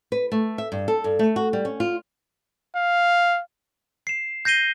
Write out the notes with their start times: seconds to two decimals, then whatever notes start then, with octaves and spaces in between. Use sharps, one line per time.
0.12 B4
0.32 A3
0.58 E5
0.72 G2
0.88 A4
1.04 G2
1.19 A3
1.36 F#4
1.53 G3
1.65 C#4
1.80 F4
2.76 F5
4.07 C7 E7
4.45 G6 A#6 C7 D#7 G7